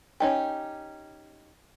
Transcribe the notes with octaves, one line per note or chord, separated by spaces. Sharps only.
C#4 D#4 G4